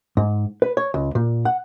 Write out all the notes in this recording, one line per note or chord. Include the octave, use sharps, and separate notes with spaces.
G#2
B4
C#5
C#2
A#2
F#5